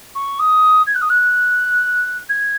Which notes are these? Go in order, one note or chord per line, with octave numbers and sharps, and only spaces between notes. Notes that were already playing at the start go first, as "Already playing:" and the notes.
C#6
D#6
G#6
F#6
D#6
F#6
G#6